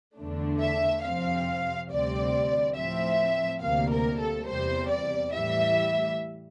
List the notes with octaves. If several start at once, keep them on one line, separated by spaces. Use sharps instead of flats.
E2 D3 A3 D4
E5
F2 C3 F3 C4 F5
D2 C3 G3 C4 D5
A2 F3 C4 E5
D2 C3 G3 A#3 F5
A#4
A4
E2 C3 G3 C5
D5
A2 E3 G3 E5